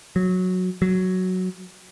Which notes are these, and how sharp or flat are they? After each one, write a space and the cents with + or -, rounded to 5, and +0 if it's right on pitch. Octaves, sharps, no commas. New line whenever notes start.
F#3 -10
F#3 +0